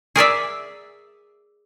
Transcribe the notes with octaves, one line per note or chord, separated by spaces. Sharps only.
G#4 A#4 D5 E5